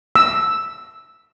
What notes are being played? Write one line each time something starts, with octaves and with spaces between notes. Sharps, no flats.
E6